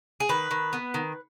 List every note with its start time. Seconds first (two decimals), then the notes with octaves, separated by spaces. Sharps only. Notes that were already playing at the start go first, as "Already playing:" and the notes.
0.20 G#4
0.29 D#3 B4
0.51 D#3
0.73 B3
0.94 D#3